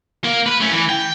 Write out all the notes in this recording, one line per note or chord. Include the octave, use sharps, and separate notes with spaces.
A#3
B4
A3 C#4
E3
G5